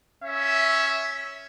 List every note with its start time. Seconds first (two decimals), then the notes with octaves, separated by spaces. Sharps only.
0.24 C#4 E5